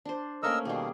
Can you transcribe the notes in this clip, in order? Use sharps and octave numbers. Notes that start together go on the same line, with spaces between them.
D4 C5
A3 A#3 C#4 A#4 D#5 E6
B2 D#3 G3 A#3 G#4